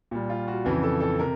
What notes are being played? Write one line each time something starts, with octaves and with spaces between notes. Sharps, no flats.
A#2 G3
F4
F#4
F2 C#3 E3
A4
A4
C3 A#4